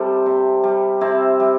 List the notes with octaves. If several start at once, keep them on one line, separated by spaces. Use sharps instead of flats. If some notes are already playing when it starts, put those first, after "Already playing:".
Already playing: C3 G3 G4 A4 C5
C3
G3
C3 C4 E4
G3